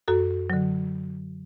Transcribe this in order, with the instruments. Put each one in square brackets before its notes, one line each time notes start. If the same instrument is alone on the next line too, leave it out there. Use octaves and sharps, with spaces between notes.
[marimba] F#2 F#4 A4
D3 F#3